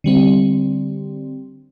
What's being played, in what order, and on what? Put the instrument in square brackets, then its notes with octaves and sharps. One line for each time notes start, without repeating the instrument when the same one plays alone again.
[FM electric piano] D3 G3 C4